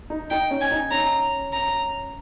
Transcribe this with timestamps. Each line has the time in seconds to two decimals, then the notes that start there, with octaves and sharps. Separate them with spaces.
0.10 D#4
0.30 D#4 G5
0.51 C#4
0.61 G#5
0.71 D#4
0.92 C#4 A#5
1.53 A#5